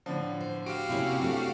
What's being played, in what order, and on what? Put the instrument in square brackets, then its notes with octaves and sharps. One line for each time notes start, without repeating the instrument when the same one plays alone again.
[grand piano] A2 D3 F3
[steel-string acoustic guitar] C5
[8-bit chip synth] F#4 G4 F5 [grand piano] D7
[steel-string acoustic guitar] C3 A#3 [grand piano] C#4 E4 F4
[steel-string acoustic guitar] A3 C4 D4